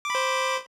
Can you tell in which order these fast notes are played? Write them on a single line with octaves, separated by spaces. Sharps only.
D6 B5 C5